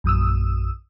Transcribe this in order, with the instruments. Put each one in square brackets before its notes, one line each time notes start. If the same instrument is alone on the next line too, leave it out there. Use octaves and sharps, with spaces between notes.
[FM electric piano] A#1 F#2 D#6 E6